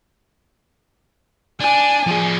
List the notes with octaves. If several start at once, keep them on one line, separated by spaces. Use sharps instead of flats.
D4 G#5
F3 G#4